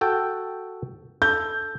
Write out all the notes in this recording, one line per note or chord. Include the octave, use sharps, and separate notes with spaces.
F#4 A4 G5
A4 G6